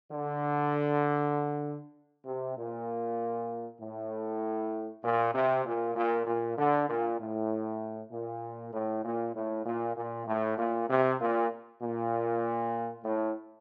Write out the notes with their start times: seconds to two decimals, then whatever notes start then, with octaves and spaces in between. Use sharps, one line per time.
0.11 D3
2.26 C3
2.57 A#2
3.80 A2
5.03 A#2
5.34 C3
5.65 A#2
5.96 A#2
6.26 A#2
6.57 D3
6.88 A#2
7.19 A2
8.12 A#2
8.73 A2
9.04 A#2
9.35 A2
9.65 A#2
9.97 A#2
10.27 A2
10.58 A#2
10.88 C3
11.20 A#2
11.81 A#2
13.04 A2